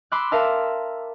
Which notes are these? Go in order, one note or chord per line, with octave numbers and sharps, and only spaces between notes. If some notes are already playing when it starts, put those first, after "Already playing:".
B5 C6 D6 E6 F#6
A#4 E5 F5 A5 E6